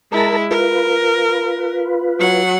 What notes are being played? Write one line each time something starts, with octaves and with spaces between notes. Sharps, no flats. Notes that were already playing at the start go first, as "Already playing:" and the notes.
G#3 E4 A#4 A5 A#5
F4 A#4 B4
F#3 F#5